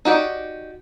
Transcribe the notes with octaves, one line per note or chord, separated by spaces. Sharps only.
D#4 F#4 G4 D5